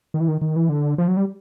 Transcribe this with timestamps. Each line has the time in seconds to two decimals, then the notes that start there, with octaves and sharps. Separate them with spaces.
0.14 D#3
0.20 E3
0.28 D#3
0.41 D#3
0.56 E3
0.69 D3
0.98 F3
1.08 F#3
1.17 G3